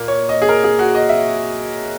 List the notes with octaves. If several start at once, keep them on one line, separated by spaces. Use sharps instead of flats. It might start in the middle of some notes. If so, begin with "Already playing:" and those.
Already playing: A#2 A#3
C#5
D#5
G#4
A#4
G#4
F#4
D#5
E5